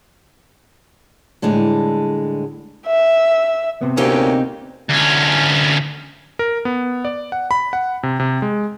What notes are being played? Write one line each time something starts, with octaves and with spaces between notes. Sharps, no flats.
A2 D3 G3 G#3
E5
C3 B3
D2 A#3 C4 C#4 D#4 G4
D2 C#4
A#4
B3
D5
F#5
B5
F#5
C3
C3
G#3